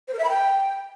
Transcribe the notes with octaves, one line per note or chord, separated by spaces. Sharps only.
C5
A#4
E5
B5
G5